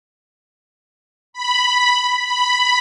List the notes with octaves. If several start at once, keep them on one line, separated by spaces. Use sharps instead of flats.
B5
B5